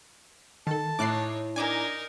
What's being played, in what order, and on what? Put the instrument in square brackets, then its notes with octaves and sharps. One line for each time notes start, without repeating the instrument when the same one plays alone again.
[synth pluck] D#3 A4 [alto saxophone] A5
[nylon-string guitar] A2 E4 E5 [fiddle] D#4 C#5 [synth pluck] D6 F#6 C7
[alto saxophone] D4 [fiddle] D#4 A#4 [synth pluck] G#5 D6 G#6